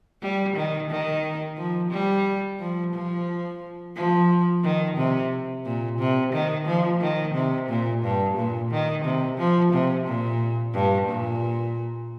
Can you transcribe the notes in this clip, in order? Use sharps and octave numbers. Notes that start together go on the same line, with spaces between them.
G3
D#3
D#3
F3
G3
F3
F3
F3
D#3
C3
A#2
C3
D#3
F3
D#3
C3
A#2
G2
A#2
D#3
C3
F3
C3
A#2
G2
A#2